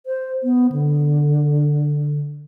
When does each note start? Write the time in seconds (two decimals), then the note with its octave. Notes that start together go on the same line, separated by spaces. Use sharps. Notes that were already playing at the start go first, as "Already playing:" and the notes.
0.06 C5
0.43 B3
0.72 D3